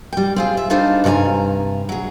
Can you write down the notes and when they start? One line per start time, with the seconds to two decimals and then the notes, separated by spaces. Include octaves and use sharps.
0.13 G3 G5
0.36 C4 F4 G#4
0.57 E5
0.70 G3 D4 D#4 F4 A4 C5
1.04 G2 C3 D5 G#5 A#5
1.89 F#3 G#4